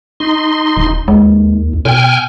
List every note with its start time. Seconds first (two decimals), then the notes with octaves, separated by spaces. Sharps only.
0.20 D#4 C6
0.77 D#1
1.08 D#2 G#3
1.85 B2 G5 G#5 F6